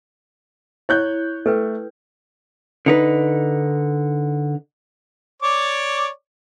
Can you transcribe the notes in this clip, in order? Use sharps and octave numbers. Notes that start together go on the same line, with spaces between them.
E4 C#5 F#6 G6
A3 A4 B4 G5
D3 D#4 B4
C#5 D5 D6